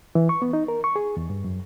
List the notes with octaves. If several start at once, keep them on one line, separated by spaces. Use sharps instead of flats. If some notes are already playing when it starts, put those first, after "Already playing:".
E3
C#6
B3
D#4
A#4
C#6
G#4
E2
G2
F#2